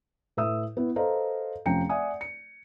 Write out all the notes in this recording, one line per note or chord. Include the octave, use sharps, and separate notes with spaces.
A2 B4 E5 D#6 E6
B3 E4
A4 B4 C5 D#5 F5 A#5
F1 F3 C#4 G5 A#5 C#7
D5 E5 F#5 G#5 D#6
C#7